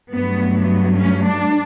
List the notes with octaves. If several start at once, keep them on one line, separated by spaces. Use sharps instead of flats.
G2 F#3 A3 B3
B3
C#4
D4